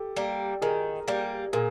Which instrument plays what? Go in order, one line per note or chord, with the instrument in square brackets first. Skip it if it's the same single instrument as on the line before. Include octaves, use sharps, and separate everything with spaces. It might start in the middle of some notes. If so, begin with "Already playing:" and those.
Already playing: [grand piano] G4 A4
[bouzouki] G3 A#3
[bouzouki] D#3 [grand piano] G#4 A#4
[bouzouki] G3 A#3
[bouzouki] A#2 [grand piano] G#4 A#4